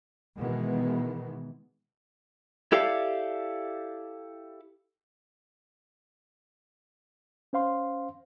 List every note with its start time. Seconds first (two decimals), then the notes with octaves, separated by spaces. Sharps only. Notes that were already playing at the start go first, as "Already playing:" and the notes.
0.38 B2 D#3 E3 G#3 B3
2.72 E4 G4 A4 D5 E5 F5
7.53 C#4 C5 F5 C6